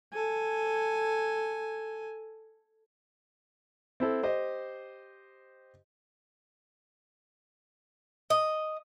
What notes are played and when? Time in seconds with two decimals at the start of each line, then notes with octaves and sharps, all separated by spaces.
0.14 A4 G#5
4.00 C4 E4 A4
4.23 G4 C5 D#5
8.30 D#5